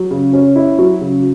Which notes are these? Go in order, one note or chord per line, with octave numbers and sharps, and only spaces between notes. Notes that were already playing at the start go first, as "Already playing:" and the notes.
Already playing: F#3
C#3
C#4
E4
F#3
C#3